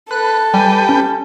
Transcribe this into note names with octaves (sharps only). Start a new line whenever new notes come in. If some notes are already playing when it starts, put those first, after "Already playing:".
A4 B4 F#6
G3 G4 B4 G5 G#5
C#4